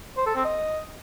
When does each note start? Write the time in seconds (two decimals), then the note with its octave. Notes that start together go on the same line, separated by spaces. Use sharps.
0.17 C5
0.26 A4
0.35 C4
0.45 D#5